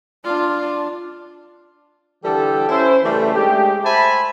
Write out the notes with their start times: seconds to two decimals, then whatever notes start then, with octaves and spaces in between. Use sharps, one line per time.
0.25 D4 F4
2.23 D3 E3 G3 G4 A4
2.69 C#4 E4 C5
3.03 C#3 E3 G3 A3
3.35 G#3 A3 D4 G4
3.84 C5 E5 G#5 A5 B5